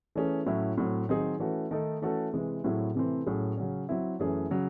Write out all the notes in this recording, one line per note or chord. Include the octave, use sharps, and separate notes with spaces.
E3 A3 C#4 G#4
A2 F#3 C#4 E4
A2 F#3 C4
D#3 F#3 C4 D#4 G#4
E3 A3 C#4 F#4
D#3 A3 D#4 A4
E3 A3 C#4 F#4 A4
C3 E3 G#3
A2 F#3 C4 E4 G#4
C3 E3 A3 C4
A2 F#3 C#4 G#4
C#3 F#3 C#4
F#3 C4 E4
F#2 E3 A3 C#4 G#4
C#3 F#3